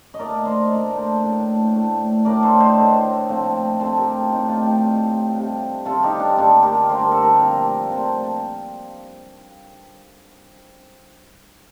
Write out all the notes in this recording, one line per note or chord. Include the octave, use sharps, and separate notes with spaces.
D#5
A#2 A3 D4 A#4 D5
C5 D#5
A#2 A3 D4 A#4 D5
A4 C5
A2 A3 D4
A2 A3 D4
A2 A3 D4 A#4 D5
A4 C5
C5 D#5
A2 A3 D4
A#2 F3 A3 C4
A#2 F3 A3 C4 A4 C5
G4 A#4
F4
A2 A3 C4 D#4
D4 F4
D#4 G4
A2 A3 C4
C3 G3 D4
C3 G3 D4 F4 A4
D#4 G4
D4
D3 G3 A#3 D4 F4 A4
G4 A#4
D3 G3 A#3 D4 C5
A#4
A4
G4 A#4
A#2 F3 C4
A#2 F3 C4 A4 C5